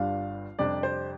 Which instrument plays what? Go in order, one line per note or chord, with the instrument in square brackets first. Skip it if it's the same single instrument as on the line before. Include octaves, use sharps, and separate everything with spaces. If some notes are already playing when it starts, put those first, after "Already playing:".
Already playing: [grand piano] G1 G2 G3 D4 F4 [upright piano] F5
[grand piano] F2 C3 G3 D4 G4 [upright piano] D5
[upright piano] C5